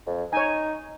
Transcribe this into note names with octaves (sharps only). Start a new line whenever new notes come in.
F2
D#4 C#5 G#5